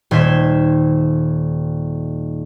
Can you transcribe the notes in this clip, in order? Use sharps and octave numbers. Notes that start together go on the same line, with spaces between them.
D#1 C5 G#6 B6 E7